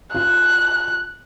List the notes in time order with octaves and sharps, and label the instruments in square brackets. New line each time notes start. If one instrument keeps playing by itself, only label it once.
[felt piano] F4 [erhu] F#6